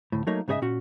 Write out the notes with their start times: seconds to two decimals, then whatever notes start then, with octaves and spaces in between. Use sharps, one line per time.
0.12 D2 A2
0.27 F#3 A3 A#3 D#4 C#5
0.48 G#2 C#3 G#4 C#5 D#5 E5
0.62 A#2 C#4 F#4